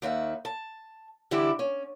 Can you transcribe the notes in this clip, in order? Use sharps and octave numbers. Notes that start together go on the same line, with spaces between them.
D#2 D#3 E5 F#5
A5
D3 E3 G3 D4 E4 G4
C#4